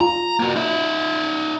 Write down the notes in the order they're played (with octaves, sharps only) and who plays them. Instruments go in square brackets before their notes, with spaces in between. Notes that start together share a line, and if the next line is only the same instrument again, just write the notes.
[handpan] F4 [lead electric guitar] A#5
[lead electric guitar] A#3 F#4
D#4 E5